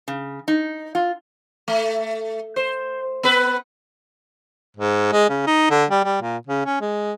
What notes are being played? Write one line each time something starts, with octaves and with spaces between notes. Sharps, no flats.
C#3
D#4
F4
A3
C5
B3 B4
G#2
G#3
C#3
D#4
D3
G3
G3
A#2
C#3
C#4
G#3